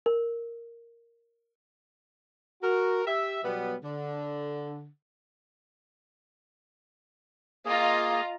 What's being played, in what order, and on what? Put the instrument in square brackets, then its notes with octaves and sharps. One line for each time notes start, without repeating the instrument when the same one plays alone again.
[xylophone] A#4
[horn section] F#4 A#4
G4 E5
B2 F#3 G3 B3
D3
[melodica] A#3 G#4 [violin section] F4 D#5 A#5